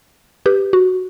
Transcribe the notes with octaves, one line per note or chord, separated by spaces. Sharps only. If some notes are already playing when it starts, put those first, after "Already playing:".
G4 B4
F#4